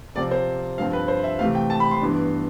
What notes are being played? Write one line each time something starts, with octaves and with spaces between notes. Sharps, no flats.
C3 F3 C4 D5
C5
G2 F3 C4 F5
B4
C5
E5
C3 E3 A3 C4 F5
G5
A5
B5
C6
G2 E3 B3 D4